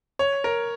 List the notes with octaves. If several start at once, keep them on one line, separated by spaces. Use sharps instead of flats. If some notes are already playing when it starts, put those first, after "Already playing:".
C#5
A#4